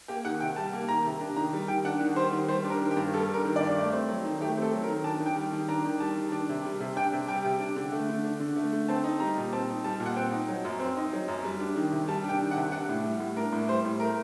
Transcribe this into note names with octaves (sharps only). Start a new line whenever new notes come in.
A#3 G4
D#3 F#5
C3 G5
G3 A5
A#3
D#3 A#5
C3
D4
D#3 A#5
G3
D#3 G5
D4 F#5
D#3
G3 C5
D#3
G3 C5
D4
A#4
D#3
G4
G2
G3 A4
D4
A#4
D#3
G2 D5
A3
C4
F#3
D#3
A3 G4
C4
A4
F#3
A#4
D#3
D4 A5
D#3
G5
G3
D#3
D4 A#5
D#3
G3 A5
D#3
D4
C3
G3
C3
D4 G5
C3
G3 G5
C3
D4
D3
A3
D3
D4
D3
A3
D3
C4 A5
D#4
G3 A#5
A#2
C4 A5
D#4
G3 A5
A#2
F#5
C4 G5
D#4
F#3
F#2
C4
D#4
F#3
F#2
G3
D4
D#3
C3
G3 A5
D4
G5
D#3
F#5
C3
D4 F#5
A2
G3
A2
D4 A#4
A2
G3 C5
A2
A3 A#4